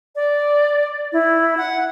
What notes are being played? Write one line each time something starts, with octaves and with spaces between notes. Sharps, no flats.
D5
E4
F#5